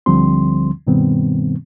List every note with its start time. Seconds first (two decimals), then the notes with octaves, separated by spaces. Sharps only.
0.06 D2 D3 F3 G3 C4 C6
0.87 G2 B2 D#3 G3 B3 C4